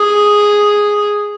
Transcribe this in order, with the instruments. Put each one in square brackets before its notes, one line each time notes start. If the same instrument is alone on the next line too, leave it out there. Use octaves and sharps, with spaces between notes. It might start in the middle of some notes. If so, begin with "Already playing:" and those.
Already playing: [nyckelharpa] G#4